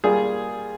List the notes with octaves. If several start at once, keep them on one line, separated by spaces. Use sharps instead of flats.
G3 A#3 F4 G#4